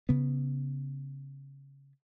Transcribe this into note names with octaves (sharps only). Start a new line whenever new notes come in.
C#3 B3